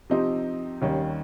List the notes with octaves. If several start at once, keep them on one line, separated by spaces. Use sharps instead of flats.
C3 F3 C4 D#4 G4
D#2 D#3 G3 C#4